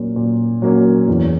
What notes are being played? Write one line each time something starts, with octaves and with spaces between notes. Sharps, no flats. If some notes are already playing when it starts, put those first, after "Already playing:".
Already playing: A#2 F#3 A#3 C#4
A#2
F#3 A#3 C#4
E2